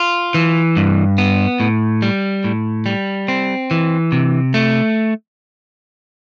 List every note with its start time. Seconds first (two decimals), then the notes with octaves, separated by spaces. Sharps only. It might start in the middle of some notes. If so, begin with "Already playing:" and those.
Already playing: F4
0.34 E3
0.76 G2
1.18 B3
1.60 A2
2.02 G3
2.44 A2
2.86 G3
3.28 C4
3.71 E3
4.12 C3
4.54 A3